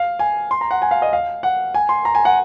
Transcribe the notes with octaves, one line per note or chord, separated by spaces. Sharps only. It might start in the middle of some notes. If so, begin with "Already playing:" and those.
Already playing: F5
G#5
C6
A#5
F#5
G#5
F5
D#5
F5
F#5
G#5
C6
A#5
G#5
F#5